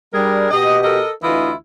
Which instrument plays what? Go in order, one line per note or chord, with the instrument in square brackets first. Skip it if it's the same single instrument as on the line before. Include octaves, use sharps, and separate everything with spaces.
[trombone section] G3 [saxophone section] D4 G#4 A#4
[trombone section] B2 G4 [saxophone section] D#5
[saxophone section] A4 A#4 D#5
[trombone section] D2 E3 [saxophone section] E4 F4 D#5